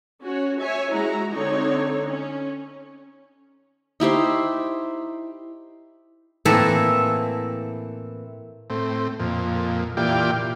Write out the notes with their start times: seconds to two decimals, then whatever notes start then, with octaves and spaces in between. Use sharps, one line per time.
0.22 C#4 F#4 C#5
0.62 C#5 E5 G#5
0.93 G#3 E4 F#4 A#5
1.31 D3 C4 D#4 C#5
2.08 C#4
4.00 D#4 E4 G4 C5
6.45 A2 E3 A#3 C4 A4 E5
8.70 A2 C4
9.19 F2 A#2
9.97 A#2 E3 F4 G4 D5 G5